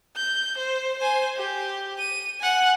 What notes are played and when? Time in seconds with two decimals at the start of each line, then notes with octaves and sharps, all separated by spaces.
0.17 G6
0.58 C5
0.98 C5 G#5
1.37 G4
1.99 D#7
2.40 F#5 G#5